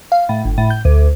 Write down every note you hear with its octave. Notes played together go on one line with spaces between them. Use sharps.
F5
A2
G1
A2
G6
D2